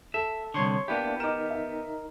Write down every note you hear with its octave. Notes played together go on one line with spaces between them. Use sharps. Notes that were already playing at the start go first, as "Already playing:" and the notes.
A4 E5
C2 D3 C#5 C6 C#6
A#3 B3 D4 E4 G4
D#4 A#4 D6 E7
E5